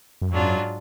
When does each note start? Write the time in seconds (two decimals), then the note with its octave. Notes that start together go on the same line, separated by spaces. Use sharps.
0.21 F#2
0.30 F2 G#2 F#3 D4 F4
0.43 F#2